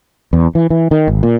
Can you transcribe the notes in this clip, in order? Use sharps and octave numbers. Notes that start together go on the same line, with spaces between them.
E2
E3
E3
D#3
G#1
A#2